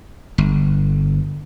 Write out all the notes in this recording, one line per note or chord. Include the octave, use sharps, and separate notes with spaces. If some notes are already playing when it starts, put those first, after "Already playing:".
G1